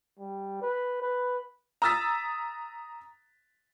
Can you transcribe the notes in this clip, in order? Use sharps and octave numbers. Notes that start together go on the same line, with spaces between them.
G3
B4
B4
A#5 D#6 E6 A6 B6